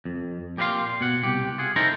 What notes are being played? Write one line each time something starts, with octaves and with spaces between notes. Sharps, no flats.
F2
A#2 G4 A#4 B4 F5 C6
B2 F#5
C2 G4
F4 G#4 F#5
D#4 E4 A4 A#4 C5 A#5